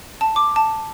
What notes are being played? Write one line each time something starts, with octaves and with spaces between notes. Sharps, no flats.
A5
D6
A5